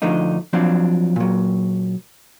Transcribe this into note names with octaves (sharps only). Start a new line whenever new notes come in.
D2 F3 A3 D4 D#4
F3 F#3 C4 D4 D5
A#2 F#3